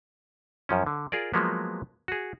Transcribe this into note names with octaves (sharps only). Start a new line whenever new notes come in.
F#2 F3 C#4
D3
F4 G#4 A#4 D5
F3 F#3 G#3 A#3 B3
F#4 G#4